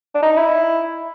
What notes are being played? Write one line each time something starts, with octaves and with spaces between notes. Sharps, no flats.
D4
D#4
E4